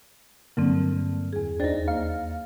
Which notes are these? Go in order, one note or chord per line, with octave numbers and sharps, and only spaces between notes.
G2 D3 F#3 A#3 C4
E2 G#4
D#2 D4 D#4 C5 A6
A#3 F5